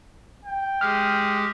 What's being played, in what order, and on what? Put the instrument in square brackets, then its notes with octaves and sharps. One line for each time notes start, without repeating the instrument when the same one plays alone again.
[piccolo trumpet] G5
[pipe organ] G#3 G4 G#4 [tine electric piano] F6